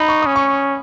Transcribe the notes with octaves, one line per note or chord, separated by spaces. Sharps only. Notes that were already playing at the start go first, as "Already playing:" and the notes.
Already playing: D#4 B5
C#6
C#4 D#6
C#6